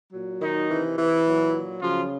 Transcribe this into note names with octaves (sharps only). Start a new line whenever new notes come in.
A#2 F#3
D#3 D#4
C3 E3
E3 E4
A#2 F#3
C#3 F3 F#3 F4